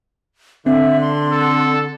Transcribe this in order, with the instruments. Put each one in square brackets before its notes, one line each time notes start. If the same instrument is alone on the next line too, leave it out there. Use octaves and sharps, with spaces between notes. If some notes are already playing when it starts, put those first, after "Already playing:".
[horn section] D3 [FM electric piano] C4 [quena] E5
[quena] C6
[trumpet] A4